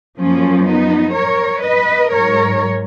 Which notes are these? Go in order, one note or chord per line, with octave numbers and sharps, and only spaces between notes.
F#2 F3 A#3 C#4
B3 D#4
A#4 C#5
B4 D#5
G#2 F#3 A#4 C#5